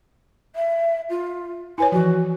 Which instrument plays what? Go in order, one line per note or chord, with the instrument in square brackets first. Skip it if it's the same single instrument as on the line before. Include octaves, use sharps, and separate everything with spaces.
[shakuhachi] E5
F4
[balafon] E4 B4 C#5 [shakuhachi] G#5
[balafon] E3 F3 [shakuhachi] F#4